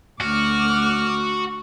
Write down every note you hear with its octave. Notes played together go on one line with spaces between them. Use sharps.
D2 F#4 D6 F6